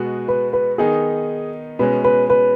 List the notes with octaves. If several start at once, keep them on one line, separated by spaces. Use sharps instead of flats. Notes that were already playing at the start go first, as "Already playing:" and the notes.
Already playing: B2 G#3 B3 F#4
B4
B4
D#3 B3 D#4 G#4
B2 G#3 C#4 B4
B4
B4